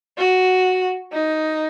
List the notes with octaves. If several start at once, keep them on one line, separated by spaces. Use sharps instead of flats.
F#4
D#4